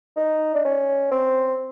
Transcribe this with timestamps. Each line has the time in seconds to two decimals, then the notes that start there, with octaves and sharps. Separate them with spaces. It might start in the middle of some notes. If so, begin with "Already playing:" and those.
0.16 D#4
0.55 D4
0.65 C#4
1.11 C4